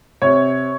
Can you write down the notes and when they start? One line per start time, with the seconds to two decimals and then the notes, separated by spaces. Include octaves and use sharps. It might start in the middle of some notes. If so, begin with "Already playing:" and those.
0.22 C3 C#5